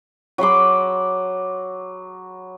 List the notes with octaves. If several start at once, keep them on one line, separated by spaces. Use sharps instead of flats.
F#3 B5 C6 D6